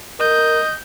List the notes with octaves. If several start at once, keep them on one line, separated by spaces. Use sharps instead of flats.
A#4 D#5 G6